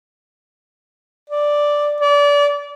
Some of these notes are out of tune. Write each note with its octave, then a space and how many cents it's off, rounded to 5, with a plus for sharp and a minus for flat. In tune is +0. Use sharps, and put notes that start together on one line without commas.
D5 +0
D5 -30